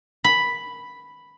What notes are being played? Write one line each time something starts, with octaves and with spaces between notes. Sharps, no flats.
B5